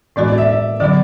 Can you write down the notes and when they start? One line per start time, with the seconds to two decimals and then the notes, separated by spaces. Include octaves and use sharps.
0.16 A2 E3 G#3 B3 F#4 D5
0.28 D5
0.38 E5
0.49 E5
0.80 D3 F#3 B3 D5